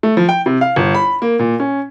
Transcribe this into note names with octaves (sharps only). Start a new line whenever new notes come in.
A3
F3
G5
C3
F5
G1
B5
A#3
A#2
C#4